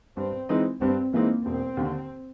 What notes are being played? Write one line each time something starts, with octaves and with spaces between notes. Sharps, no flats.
G2 C4
E3 G#3 C4 D#4
G2 C4
E3 G#3 A#3 C4 D#4
E1 C4
D#2 D3